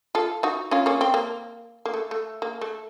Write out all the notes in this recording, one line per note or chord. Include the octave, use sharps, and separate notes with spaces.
F4 A4
D#4 F#4
C#4 F4
A#3 C#4
C4
A#3
A#3
A3
A3
A#3
A3